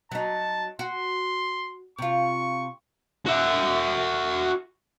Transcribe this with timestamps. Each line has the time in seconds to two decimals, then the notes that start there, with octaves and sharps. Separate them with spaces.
0.11 F#3 D#4 A5
0.79 F#4 C6
1.98 C3 F4 C#6
3.26 F#4 E5